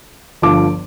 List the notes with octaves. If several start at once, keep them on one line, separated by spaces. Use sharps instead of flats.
G1 G2 F3 D6